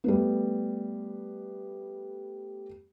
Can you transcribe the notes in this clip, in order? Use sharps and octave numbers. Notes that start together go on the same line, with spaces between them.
G3 A3 B3